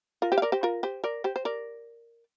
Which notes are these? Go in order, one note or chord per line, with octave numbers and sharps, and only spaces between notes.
F4 A#4
G4 C5
F5
A#4 D5
G4 C5
F4 A#4
G4 C5
A#4 D5
G4 C5
C5
A#4 D5